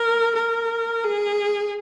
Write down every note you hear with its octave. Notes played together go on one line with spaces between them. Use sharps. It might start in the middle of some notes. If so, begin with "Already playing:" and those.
Already playing: A#4
A#4
G#4